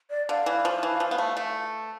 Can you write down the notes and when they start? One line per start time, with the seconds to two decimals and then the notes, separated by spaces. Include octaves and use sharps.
0.10 D5
0.29 D3 F5
0.46 E3
0.65 F3
0.83 E3
1.00 F3
1.11 B3
1.18 A3
1.37 A3